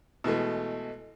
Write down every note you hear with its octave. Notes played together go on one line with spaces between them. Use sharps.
B2 E3 G#3 A3